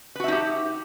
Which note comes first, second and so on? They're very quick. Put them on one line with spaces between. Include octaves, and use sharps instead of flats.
B4 F#4 E5 D#4 G4